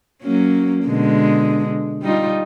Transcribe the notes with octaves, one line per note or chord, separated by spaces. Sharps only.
F#3 A#3 C#4
B2 D3 G#3
G3 D#4 F4